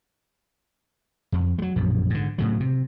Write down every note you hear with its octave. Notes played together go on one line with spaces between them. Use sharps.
F2
F#3 G#3
A#1 F#2 B2
G#2 D3
A2 C#3 F#3
C3